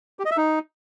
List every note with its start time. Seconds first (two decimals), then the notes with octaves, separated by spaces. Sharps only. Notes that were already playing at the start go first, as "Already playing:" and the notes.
0.19 G4
0.25 D#5
0.31 E5
0.37 D#4